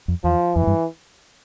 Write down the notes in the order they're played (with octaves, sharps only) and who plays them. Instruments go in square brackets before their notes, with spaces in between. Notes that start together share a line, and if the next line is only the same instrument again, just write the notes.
[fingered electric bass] F2
[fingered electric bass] E2 [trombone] F3
[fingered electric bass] F2 [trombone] E3
[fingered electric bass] G#2
G2